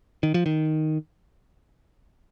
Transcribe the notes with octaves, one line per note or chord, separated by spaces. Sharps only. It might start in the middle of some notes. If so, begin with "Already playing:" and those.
D#3
F3
D#3